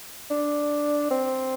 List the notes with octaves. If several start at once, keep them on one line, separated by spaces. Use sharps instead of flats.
D4
C4